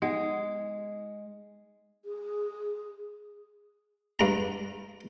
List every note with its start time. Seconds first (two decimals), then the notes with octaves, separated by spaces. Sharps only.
0.02 G#3 B3 D#4 F#5
2.05 G#4
4.19 G2 A#5